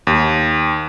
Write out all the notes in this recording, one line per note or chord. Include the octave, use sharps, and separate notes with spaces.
D#2